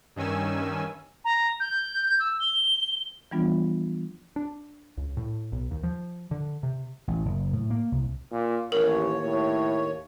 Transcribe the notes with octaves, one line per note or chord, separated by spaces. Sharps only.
G2 D#3 C#4 G#5 E6
A#5
G6
E6
G7
E3 F3 G3 B3 D4 F4
D4
C#2
A2
B1
D#2
F3
D3
C3
A1
F#1
A2
A#3
C2
A#2
A1 D#2 A#4 C#5
A2